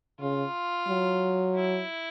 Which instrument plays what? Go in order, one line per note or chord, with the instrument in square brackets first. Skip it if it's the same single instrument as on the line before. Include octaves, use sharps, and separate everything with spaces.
[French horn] C#3 [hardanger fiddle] F4
[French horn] F#3
[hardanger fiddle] E4